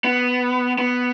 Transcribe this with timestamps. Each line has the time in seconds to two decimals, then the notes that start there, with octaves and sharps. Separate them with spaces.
0.04 B3
0.79 B3